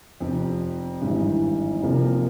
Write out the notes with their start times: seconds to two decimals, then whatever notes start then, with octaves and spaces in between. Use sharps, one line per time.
0.20 F1 F2 C3
1.02 G#1 G2 E3
1.83 F1 F2 C3 F3 A#3